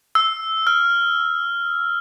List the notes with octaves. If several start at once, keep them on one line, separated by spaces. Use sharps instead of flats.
E6
F6